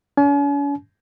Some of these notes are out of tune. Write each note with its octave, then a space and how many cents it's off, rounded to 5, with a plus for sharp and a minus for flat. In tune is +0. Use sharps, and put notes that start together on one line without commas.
C#4 +45 G#5 +45